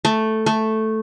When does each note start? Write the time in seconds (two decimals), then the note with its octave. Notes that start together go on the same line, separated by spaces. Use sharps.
0.05 A3
0.46 A3